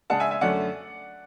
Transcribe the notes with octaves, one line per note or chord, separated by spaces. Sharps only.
C#3 G#3 D4 F#5 A5
E5 G#5
E5 G#5
F#2 D3 A3 C#4 D5 F#5